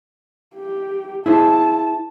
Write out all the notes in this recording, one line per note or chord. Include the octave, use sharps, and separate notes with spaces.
G4
E4 G#4 C5 A5